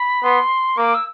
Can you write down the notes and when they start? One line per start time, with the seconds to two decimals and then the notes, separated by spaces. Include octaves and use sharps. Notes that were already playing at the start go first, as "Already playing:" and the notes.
Already playing: B5
0.23 B3 C6
0.77 A#3 D6
0.95 E6